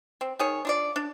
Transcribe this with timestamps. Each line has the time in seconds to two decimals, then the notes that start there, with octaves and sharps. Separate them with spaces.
0.21 C4
0.39 D#3 G#4 C#5
0.65 D4 F4 D5
0.96 D4